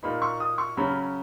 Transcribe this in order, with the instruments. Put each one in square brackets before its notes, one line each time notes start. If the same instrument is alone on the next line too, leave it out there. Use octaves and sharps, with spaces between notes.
[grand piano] A#2 A#3 D#4 [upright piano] B5
[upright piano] C#6
D#6
C#6
[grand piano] C#3 F#3 C#4 [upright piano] B5